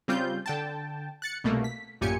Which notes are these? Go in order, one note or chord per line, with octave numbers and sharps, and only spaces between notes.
C#3 G3 C4 F4 G6
D3 G5 A5
F#6 A6 C#7
C2 B2 A3 A#3
B6
A1 F#2 A#2 G4 G#5 C#7